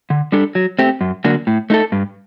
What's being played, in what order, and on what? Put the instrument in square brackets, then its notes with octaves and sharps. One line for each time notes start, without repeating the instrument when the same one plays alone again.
[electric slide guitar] D3
G3 D4 A4
F#3
A3 C4 G4
F#2
D3 F#3 A#3 D4
A2
A3 D#4 A4
G2